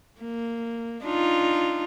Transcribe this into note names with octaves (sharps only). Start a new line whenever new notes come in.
A#3
D4 D#4 F4